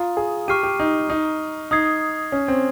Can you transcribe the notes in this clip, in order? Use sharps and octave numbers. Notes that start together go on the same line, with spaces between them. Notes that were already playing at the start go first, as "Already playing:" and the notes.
Already playing: F4 A#5 D#6
G#4
G4 C#6 F6 C7 D#7
G4
D#4
D#4
D#4 D#6 G#6 C7
C#4
C4